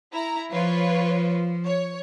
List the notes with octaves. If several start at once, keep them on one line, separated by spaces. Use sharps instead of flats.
E4 A#5
F3 F4 B4 C#5
C#5